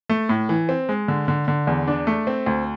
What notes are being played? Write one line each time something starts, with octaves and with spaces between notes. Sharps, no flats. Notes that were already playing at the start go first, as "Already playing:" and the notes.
A3
A2
E3
C4
G#3
D3
D3
D3
E2
D4
A3
C4
D2